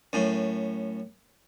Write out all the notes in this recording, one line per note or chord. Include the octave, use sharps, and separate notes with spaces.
F#2 A2